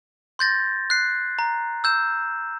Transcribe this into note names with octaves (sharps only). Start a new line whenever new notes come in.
C6 G6 A6 A#6
F#6 C7
A#5
E6 G6 E7